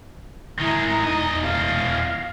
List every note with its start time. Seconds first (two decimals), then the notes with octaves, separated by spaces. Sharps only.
0.60 D#3 G#3 E4 A#5
1.04 E2 D#4 D#5
1.44 F5